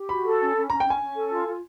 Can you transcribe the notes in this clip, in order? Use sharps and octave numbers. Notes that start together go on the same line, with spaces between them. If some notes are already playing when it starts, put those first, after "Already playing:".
Already playing: G4
F#4 B5
A4
C#4
C#4
C#4 A#5
G5
C#4
G#5
C#4
A4
F4
F4